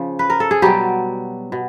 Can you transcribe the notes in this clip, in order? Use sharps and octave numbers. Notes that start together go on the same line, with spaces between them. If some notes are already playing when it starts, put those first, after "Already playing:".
Already playing: C#3 F3
B4
A#4
A4
G#4
B2 F#3 G3 G4
B2